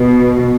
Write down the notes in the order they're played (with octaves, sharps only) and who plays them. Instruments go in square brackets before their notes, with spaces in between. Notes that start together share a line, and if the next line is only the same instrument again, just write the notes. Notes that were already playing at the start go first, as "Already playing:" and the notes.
Already playing: [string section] B2